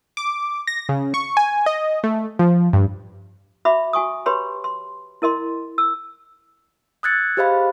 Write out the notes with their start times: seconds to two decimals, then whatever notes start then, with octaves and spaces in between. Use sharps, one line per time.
0.17 D6
0.67 A#6
0.89 C#3
1.14 C#6
1.37 G#5
1.66 D#5
2.04 A3
2.39 F3
2.73 G2
3.65 F#4 E5 B5 D6
3.93 F#4 G#5 C#6 D#6
4.26 G4 B4 C#5 B5 C6
4.64 C6
5.22 E4 A#4 D#5 C6
5.78 E6
7.03 D#6 E6 F#6 G#6 A6 C#7
7.37 G4 G#4 C5 D#5 F5 B5